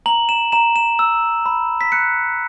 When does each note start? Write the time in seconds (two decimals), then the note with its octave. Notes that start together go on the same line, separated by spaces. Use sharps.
0.06 A#5 F#7
0.29 E7
0.52 A#5 E7
0.76 E7
0.99 E6
1.46 B5
1.81 B6
1.92 F#6 C#7